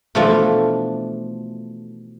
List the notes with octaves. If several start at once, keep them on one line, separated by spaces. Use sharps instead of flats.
B2 E3 F3 A3 D4 F4